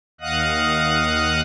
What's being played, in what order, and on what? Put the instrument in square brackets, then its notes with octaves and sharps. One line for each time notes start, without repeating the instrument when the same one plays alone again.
[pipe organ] D#2 D#5 F5 F#5 D#6 F#6